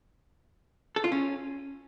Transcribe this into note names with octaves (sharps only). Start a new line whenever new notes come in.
A4
F4
C#4